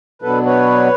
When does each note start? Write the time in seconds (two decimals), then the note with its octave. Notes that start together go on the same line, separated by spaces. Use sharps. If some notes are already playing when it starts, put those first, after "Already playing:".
0.22 B2 F#3 B3 D4 A4 B4
0.45 B4 C#5